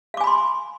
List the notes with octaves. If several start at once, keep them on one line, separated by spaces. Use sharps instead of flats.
F5 G#5 B5 C6 D6